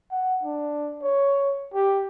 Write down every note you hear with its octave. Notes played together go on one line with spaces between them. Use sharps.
F#5
D4
C#5
G4